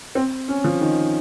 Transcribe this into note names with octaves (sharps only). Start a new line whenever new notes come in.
C4
C#4
F3
D#3